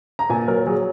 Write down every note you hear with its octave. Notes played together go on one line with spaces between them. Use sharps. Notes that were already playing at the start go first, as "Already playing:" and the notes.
A#5
A#2 G#5
F#3 A#4
F#3 G#4